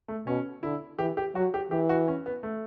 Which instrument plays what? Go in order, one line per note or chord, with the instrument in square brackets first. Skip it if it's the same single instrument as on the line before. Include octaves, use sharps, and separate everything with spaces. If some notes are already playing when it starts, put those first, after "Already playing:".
[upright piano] A3
[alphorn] B2 [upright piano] C#4
[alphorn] D3 [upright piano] E4
[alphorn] E3 [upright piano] G4
[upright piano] G4
[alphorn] F#3 [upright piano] F#4
[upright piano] G4
[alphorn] E3 [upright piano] G4
[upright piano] F#4
C#4
B3
A3